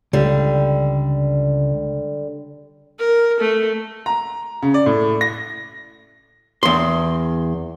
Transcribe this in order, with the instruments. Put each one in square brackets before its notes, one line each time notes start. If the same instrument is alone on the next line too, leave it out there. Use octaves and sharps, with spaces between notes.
[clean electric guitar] C#2 [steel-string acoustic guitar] D3 G3
[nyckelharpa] A#4
A3
[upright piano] A#5
C#3
D5
A2
A#6
[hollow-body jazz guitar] E2 C6